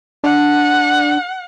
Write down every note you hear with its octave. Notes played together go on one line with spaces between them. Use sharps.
D4 F#5